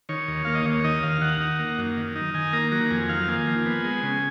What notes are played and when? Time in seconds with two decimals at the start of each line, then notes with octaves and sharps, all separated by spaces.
0.09 D#3 C#5
0.28 D#2
0.45 A#3 F5
0.55 D#5
0.66 D#2 C#5
0.84 D#3 D#5
1.03 D#2 F5
1.22 D#3 F#5
1.41 D#4
1.59 A#3
1.78 F#2
1.97 D#3
2.16 D#4
2.34 D#3 G#5
2.53 A#3 A#5
2.72 F#3 A#5
2.91 F2 G#5
3.09 D#3 F5
3.28 A#3 G#5
3.47 F3
3.66 B3
3.84 G#3
4.03 C#3